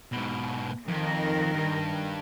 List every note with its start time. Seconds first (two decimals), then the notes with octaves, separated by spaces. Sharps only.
0.12 G#2 B2
0.88 F2 D#3 A#4
1.54 G2